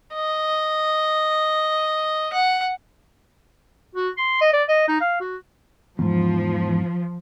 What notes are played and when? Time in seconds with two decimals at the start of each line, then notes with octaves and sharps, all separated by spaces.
0.14 D#5
2.33 F#5
3.96 F#4
4.17 C6
4.41 D#5
4.53 D5
4.69 D#5
4.88 D#4
5.01 F5
5.20 F#4
5.99 E2 G#2 F3